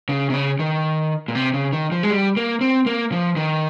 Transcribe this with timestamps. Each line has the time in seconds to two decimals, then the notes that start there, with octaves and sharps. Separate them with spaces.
0.09 C#3
0.30 C3
0.34 C#3
0.59 D#3
1.28 A#2
1.35 C3
1.54 C#3
1.73 D#3
1.92 F3
2.03 G#3
2.11 G3
2.37 A#3
2.61 C4
2.86 A#3
3.12 F3
3.36 D#3